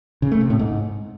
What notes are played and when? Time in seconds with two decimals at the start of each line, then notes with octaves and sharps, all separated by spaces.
0.22 C#3
0.32 A3
0.41 C3
0.50 A2
0.59 G#2